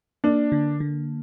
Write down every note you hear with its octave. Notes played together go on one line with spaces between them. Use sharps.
A#3 D4
D3
D3